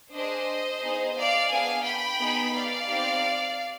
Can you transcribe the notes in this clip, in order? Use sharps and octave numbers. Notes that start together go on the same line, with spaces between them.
D4 G#4 C5 D#5
B3 D#4 G#4
D5 F5
B3 D4 G#4 F5 G#5
G5 B5
B3 D#4 G#4
D5 F5
C4 D#4 G4